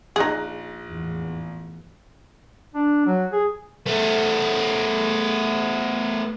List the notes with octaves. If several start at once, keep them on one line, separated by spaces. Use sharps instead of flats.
A#1 D#4 G#4 F#6 A#6
E2 A2
D4
F#3
G#4
A3 B3